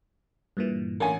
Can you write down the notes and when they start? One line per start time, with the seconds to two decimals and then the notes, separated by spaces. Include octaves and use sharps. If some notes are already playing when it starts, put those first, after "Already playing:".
0.57 G2 A#2 E3
1.00 A1 D3 A#3 G#5